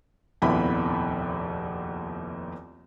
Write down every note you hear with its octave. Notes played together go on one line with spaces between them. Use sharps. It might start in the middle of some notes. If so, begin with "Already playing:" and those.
F1 A#1 D#2 B3 E4 B5